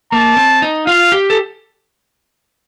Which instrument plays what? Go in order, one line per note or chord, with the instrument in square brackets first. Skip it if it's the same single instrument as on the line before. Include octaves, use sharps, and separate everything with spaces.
[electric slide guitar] A#3 [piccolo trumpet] A5
[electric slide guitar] C4
D#4
[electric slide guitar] F4 [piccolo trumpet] F5
[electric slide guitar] G4
A4